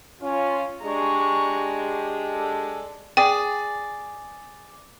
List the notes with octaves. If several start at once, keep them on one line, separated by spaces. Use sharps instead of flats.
C#4 F4
G#3 D4 G4 A#5 C#6
A4
G#4 D5 G5